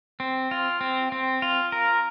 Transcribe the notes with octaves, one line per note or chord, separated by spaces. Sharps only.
C4
F4
C4
C4
F4
A#4